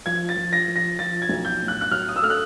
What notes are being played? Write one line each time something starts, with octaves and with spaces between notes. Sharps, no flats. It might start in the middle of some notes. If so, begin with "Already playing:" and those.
F3 G#6
A6
F3
A#6
F3
A#6
F3 A6
G#6
B1
G6
A2
F#6
F#6
F#3 F6
D#6
E6
A3 F6
F#6